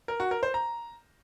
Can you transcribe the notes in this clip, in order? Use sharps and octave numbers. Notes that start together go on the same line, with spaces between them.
A#4
F#4
A#4
C5
A#5